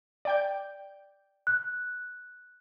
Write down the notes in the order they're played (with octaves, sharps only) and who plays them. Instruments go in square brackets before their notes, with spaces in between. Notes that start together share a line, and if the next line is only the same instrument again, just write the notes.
[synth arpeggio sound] D5 G5 G6
[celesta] F#6